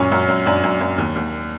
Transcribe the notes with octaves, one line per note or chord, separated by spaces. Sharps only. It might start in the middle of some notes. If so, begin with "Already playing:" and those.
Already playing: F#2 A#2 C#4
F#2
F#2
F#2 D4
F#2
F#2
D#2
D#2